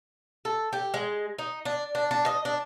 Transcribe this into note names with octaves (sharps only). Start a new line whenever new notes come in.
A4
G4
G#3
D#4
D4
D4
D4
D#5
D4